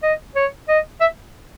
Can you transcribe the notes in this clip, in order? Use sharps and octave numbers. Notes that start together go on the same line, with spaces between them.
D#5
C#5
D#5
E5